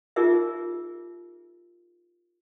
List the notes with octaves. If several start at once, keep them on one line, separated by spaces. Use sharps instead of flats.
D#4 F4 G4 G#4 A#4 E5